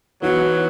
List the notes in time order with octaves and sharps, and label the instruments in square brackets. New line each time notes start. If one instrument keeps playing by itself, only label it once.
[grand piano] E3 B3 D#4 F#4 [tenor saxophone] F#3